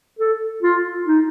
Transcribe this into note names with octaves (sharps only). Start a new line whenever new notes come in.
A4
F4
D#4